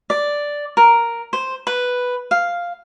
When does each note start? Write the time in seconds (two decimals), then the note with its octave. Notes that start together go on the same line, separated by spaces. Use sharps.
0.10 D5
0.77 A#4
1.33 C5
1.67 B4
2.31 F5